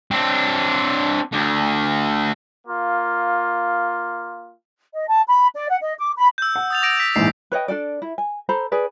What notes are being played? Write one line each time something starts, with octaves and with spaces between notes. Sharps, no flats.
C4 D4
D2 D3
A#3 F4
D#5
A5
B5
D5
F#5
D#5
D6
B5
E6 G6
F#5
D#6 A6 F7
D6 A#6 D7
B6
A#1 G#2 E3 C7
B4 C#5 D#5 G5
D4 F#4 A4 D5
E4
G#5
A4 C5 A#5 B5
G#4 B4 D5